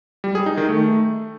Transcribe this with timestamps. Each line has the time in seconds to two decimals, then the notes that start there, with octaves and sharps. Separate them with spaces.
0.24 G3
0.35 G#4
0.46 D#4
0.57 D#3
0.69 A3